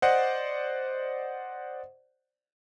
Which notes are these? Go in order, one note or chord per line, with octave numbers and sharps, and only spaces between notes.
C5 D5 D#5 F#5